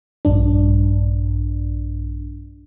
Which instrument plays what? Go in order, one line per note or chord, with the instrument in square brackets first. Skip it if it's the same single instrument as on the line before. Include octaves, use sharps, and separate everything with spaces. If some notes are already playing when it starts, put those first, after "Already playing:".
[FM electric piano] A#1 G2 D4